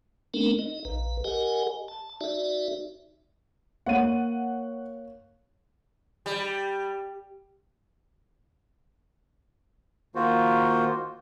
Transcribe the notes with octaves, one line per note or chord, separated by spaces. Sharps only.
A3 B3 C4 D4 D#4 A#4
D#4 D#5
A#1 B4
G4 A#4 D#5 F#5 G#5
A5
D#4 F#4 D5 E5
A#3 C#5 F#5 D#7
G3
D#3 A#3 F4 F#4 C5